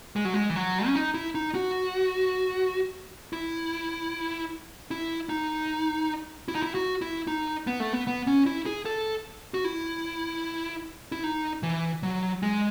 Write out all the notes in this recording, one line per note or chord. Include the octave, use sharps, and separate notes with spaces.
G#3
F#3
G#3
E3
F#3
C#4
D#4
E4
D#4
F#4
E4
E4
D#4
E4
D#4
E4
F#4
E4
D#4
B3
A3
B3
B3
C#4
E4
G#4
A4
F#4
E4
E4
D#4
E3
F#3
G#3